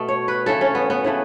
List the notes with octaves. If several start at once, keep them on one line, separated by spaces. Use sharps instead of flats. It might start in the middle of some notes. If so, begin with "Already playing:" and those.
Already playing: B2 A3
C#5
B4
C#3 E3 A3 A4
C#4
B3
B3
C#3 E3 A3